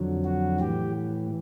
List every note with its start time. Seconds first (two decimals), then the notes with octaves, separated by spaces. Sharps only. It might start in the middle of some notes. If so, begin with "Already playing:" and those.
Already playing: F2 D3 F#3
0.25 F#4
0.60 A2 E3 G4